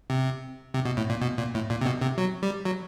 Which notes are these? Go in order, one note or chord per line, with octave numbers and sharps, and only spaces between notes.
C3
C3
B2
A2
A#2
B2
A#2
A2
A#2
C3
B2
C3
F#3
G3
F#3